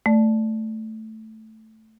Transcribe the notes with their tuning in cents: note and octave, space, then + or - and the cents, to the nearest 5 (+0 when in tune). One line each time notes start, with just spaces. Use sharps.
A3 +0 D5 +0